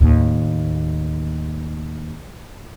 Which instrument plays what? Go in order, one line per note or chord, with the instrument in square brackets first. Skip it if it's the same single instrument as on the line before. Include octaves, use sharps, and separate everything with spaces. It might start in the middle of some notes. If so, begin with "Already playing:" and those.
[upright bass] D#2 A2